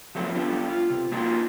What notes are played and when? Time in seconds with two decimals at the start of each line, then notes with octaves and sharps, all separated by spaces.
0.15 F3 F#3 A3 B3
0.35 B3 D4 F4 A4
0.69 F4
0.90 C3
1.12 A#3 D4 D#4 F4 F#4